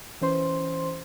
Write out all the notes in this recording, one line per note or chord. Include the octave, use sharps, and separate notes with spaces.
E3 C#4 C5 C6